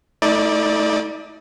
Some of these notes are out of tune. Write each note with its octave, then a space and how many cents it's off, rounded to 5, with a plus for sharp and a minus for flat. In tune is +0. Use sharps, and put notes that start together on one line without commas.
A3 +0 D#4 +45 D5 +10